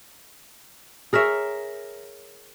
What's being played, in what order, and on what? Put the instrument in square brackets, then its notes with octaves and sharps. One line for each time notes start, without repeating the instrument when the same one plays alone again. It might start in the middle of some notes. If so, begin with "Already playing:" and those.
[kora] G#4 A#4 C#5 E5